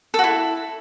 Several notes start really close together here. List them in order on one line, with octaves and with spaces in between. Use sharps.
A4 F#4 E4